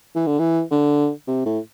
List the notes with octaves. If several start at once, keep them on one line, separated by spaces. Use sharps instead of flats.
E3
D3
E3
D3
C3
A2